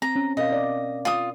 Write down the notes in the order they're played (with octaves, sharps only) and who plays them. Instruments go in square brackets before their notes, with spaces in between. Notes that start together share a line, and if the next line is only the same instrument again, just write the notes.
[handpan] C4 [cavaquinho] A#5
[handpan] C#4
[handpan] B2 A#4 F5 [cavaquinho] D#5
[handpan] D5
[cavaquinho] F4 D#6